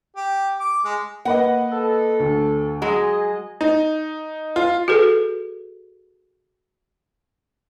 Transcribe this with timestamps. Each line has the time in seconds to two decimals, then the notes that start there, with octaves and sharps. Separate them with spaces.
0.16 G4
0.59 D6
0.85 G#3
1.25 A#3 B4 D#5 F#5
1.72 A4
2.19 D2
2.82 F#3 G#3 G#4 D#5 G#5
3.61 D#4
4.56 F4
4.88 F#4 G#4 A4 B4